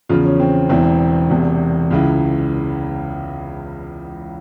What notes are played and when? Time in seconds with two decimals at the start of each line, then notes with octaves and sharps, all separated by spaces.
0.09 E2 C#3 F3 F4
0.24 C#4
0.40 C4
0.69 E1 E2 E3 C4
1.30 E1 E2 C3
1.91 C#2 C#3 E3